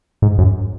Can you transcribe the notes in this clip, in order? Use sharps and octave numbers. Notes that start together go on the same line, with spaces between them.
G#2
F#2